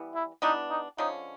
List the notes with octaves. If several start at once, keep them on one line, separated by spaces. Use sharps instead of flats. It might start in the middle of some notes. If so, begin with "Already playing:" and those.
Already playing: E3 G3 B3
E4
E3 G3 B3 D4 D#4
D#4
D3 F3 G#3 C#4 D#4